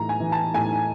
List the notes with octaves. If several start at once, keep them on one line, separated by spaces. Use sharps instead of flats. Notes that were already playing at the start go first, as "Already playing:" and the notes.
Already playing: A2 E3 A#5
G#5
E3
A5
A2 G#5